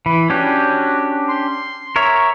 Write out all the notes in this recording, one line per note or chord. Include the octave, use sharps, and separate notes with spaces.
E3 B5
C#4 D4 F#4 G4
C6
A#4 C#5 E5